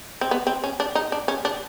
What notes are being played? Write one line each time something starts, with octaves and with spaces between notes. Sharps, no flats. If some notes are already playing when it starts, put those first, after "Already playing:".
C4
B3
C4
C#4
D4
D#4
D4
C#4
D4